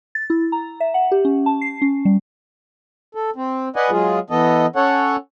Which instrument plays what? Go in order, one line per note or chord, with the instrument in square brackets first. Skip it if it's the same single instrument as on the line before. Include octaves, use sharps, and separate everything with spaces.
[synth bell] A6
E4
A#5
E5
F#5
G4
C#4
A5
C7
C#4
G3
[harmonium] A4
C4
B4 D5 D#5 F#5 G#5
F#3 G#3 F4 G#4
E3 B3 A4 D#5
C#4 A4 C#5 F#5